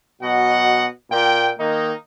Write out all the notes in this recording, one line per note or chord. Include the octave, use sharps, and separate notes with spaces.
B2 F#3 D#5 F#5
A#2 G5
D#3 A#3 D#4